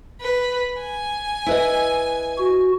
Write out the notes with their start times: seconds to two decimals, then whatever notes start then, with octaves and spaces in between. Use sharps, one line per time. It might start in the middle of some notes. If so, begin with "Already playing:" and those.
0.21 B4
0.80 G#5
1.46 E4 B4 D#5
2.39 F#4